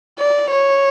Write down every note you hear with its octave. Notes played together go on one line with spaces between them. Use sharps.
D5
C#5